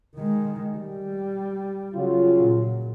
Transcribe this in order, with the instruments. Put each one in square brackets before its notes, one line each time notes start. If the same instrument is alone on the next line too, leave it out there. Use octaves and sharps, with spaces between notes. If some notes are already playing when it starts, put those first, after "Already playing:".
[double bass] D#3 G#3
G3
[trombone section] C#3 F#3 F4
[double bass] A#2